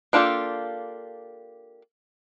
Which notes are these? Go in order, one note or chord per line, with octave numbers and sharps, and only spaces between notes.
A#3 D4 F4 G4 A4